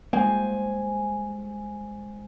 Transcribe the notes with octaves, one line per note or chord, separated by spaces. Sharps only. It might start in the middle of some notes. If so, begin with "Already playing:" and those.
G3 G#3 A#3 C5 G#5